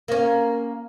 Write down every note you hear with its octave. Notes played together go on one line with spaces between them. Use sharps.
A#3 C#4